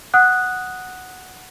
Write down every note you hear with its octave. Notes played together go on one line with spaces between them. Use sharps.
F#5 D#6 F#6